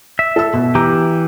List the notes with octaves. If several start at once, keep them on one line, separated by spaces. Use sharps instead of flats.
E5
A4 E6
B2
E3 G4 A#5